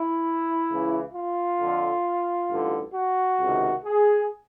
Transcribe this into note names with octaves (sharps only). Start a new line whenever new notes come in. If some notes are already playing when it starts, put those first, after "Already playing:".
Already playing: E4
C#2 C#3 E3
F4
F2 D3
A1 G2 D3
F#4
C#2 C3 D#3
G#4